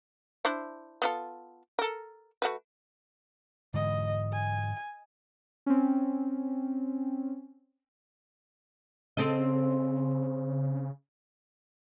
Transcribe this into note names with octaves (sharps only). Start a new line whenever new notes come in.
D4 E4 C5
B3 F4 A4
A4 A#4
A3 F#4 B4
G#2 D3 E3 D#5
G#5
C4 C#4
C#3 C4 A4 D#5